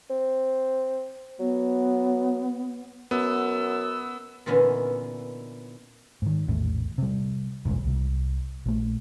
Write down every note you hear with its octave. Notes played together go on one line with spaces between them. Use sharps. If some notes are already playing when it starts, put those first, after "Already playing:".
C4
F#3 B3
F#2 B3 E6
A#2 D3 E3 B3 C#4 D#4
G#2 D#3
A#1 E2 A2
C3 G3
F#1 B1 E2 G#3
C2 C3
A#1 A3